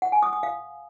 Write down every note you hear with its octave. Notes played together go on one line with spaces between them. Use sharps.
F#5
G#5
D#6
D#6
F5